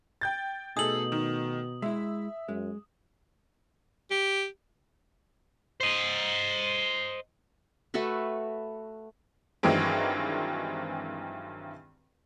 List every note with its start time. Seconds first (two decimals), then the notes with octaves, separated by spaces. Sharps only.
0.21 G5 G6 A6
0.77 B2 A3 D#4 G#4 A4 D#6 F#7
1.12 D#3
1.82 G#3 E4 E5
2.48 F#2 G#3
4.10 G4
5.81 C5 D#5
7.94 A3 F#4 A4 B4
9.63 G2 D#3 E3 F#3 G#3 C4